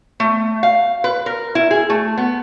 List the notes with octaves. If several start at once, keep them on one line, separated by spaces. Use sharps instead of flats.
A3
F5
B4
A#4
E4
G#4
A3
B3